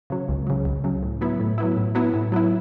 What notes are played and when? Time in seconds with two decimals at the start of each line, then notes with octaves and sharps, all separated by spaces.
0.10 C#3 F#3
0.28 C#2
0.47 C#3 F#3
0.65 C#2
0.84 C#3 F#3
1.03 A2
1.21 F#3 B3 E4
1.39 A2
1.58 F#3 B3 E4
1.77 A2
1.95 F#3 B3 E4
2.13 A2
2.32 F#3 B3 E4